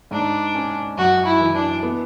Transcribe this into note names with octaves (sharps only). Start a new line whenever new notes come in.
G#2 D4
C#4
F#2 F#4
E4
E3
D4
B3